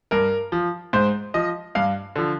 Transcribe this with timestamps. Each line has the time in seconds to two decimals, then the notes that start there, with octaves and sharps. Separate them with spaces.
0.11 G2 A#4
0.52 F3
0.93 G#2 C5
1.34 F3 D#5
1.75 G2 F5
2.16 D3 F3